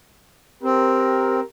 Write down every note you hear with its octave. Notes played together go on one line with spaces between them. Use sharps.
C4 G4 A#4